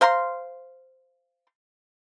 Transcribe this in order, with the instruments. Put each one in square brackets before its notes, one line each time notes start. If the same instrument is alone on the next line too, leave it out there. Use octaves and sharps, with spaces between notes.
[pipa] C5 F5 A#5 C6